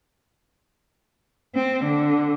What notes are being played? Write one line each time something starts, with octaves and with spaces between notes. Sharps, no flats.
C4
D3